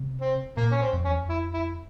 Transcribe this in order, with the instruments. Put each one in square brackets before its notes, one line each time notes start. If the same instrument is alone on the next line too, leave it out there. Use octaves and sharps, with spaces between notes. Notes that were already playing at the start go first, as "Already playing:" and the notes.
Already playing: [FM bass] C3
[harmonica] C4
[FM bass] A#2 [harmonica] A#3
[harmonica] C#4
C4
[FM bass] F2
[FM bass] E2 [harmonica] C#4
[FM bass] F2
[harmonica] E4
E4